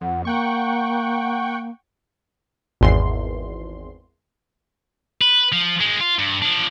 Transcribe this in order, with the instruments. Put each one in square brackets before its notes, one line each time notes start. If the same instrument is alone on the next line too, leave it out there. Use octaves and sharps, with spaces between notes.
[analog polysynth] F2 [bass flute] F#5
[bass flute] A#3 [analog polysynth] F#5 G5 C#6
[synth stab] G#1 E2 C6
[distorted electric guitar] B4
F3
D#3 G#3
F4
G2
F3 D4